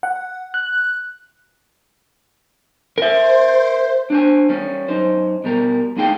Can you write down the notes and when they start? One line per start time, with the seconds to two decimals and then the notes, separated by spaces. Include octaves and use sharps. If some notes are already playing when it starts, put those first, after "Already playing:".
0.03 F#5
0.54 F#6
2.98 A#4 C5 E5
4.10 D4 C5 G#5
4.49 G3 C#4
4.88 F#2 D#4 C5
5.44 B2 G3 A#4
5.97 A3 D#4 G4 G#4 F5 G5